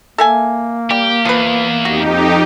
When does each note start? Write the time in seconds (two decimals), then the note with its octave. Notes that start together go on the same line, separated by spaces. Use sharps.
0.18 A#3 A4 E5 G#5
0.91 G3 G4
1.25 E2 F3 B4
1.85 F2 D#4 F#4 G4